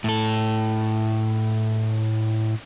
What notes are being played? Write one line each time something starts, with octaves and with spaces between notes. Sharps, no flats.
A2 A4